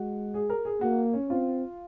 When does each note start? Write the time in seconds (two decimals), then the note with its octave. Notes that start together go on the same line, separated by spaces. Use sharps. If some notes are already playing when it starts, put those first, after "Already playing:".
Already playing: G#3 F#4
0.34 G#4
0.50 A#4
0.65 G#4
0.81 A#3 F#4
1.14 C#4
1.30 C4 F4